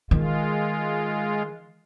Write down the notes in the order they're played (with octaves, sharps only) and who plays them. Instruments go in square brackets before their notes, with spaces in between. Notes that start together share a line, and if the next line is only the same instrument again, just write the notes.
[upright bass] D#3 [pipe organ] G#3 F4